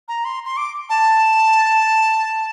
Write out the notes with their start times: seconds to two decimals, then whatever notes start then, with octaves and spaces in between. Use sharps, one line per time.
0.08 A#5
0.25 C6
0.45 C6
0.57 D6
0.89 A5